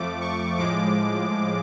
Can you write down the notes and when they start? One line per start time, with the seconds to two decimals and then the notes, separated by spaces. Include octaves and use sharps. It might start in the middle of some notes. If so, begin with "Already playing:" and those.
Already playing: F2 F3 A3 D6
0.21 C#6
0.58 A2 F3 G#3 D6